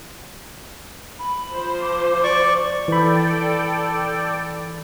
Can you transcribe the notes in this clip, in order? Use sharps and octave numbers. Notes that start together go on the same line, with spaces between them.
B5
F3 C5
D6
D5 C#6
E3 A4 D5 G5 B5